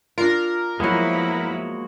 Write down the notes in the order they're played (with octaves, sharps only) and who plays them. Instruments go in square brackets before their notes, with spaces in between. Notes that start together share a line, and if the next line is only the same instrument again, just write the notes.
[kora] D4 F4 [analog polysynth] A#4
[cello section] F3 E4 B4 [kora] F#3 B3 [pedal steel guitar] G#3 A#3 F#4